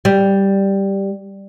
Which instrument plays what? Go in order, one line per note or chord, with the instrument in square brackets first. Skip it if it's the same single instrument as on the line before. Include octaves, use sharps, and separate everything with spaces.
[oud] G3